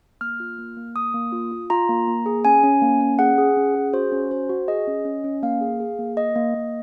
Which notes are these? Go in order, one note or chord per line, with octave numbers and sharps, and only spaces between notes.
A#3 F6
F4
A#3
A#3
A#3 D#6
A#3
F4
F4
F4 A#5
A#3
A#3
G#4
C#4 G#5
C#4
A#3
C#4
G#4 F#5
G#4
C#4
G#4
F#4 C5
C#4
F#4 C5
F#4
G#4 D#5
C#4
C#4
C#4
A#3 F5
G#4
G#4
A#3
A#3 D#5
A#3
A#3